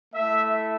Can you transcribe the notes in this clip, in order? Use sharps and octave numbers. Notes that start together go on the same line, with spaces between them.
A3 E4 E5